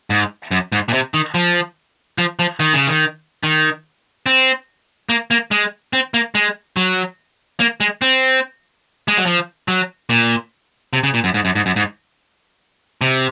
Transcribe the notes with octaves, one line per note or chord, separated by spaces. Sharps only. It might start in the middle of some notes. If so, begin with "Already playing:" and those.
G#2
F#2
G#2
A#2
C3
D#3
F3
F3
F3
D#3
C#3
D#3
D#3
C4
A#3
A#3
G#3
C4
A#3
G#3
F#3
A#3
G#3
C4
G#3
F#3
F3
F#3
A#2
C3
C#3
A#2
F#2
G#2
F#2
G#2
F#2
G#2
C3